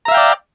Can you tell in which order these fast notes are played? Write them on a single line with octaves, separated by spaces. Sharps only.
A#5 E5 F5 G5 D5